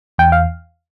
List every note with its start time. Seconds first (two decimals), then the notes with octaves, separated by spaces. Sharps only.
0.18 E2 G5
0.32 F5